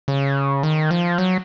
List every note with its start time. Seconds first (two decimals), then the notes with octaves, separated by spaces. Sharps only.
0.08 C#3
0.63 D#3
0.91 F3
1.18 F#3